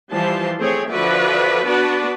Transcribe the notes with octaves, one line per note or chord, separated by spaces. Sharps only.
E3 F3 G3 A5 C6
A3 C4 G#4 C#5
D3 F3 F#4 B4 D5 E5
B3 D4 F#4 B4 D5 A5